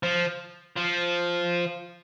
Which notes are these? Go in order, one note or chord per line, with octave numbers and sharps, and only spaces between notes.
F3
F3